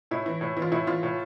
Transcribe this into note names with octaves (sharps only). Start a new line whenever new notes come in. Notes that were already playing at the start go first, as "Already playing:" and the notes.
A2 E4
E3
A2
E3
F4
A2 E4
E3 F4
A2